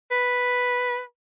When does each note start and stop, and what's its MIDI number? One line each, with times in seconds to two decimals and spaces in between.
0.11 1.01 71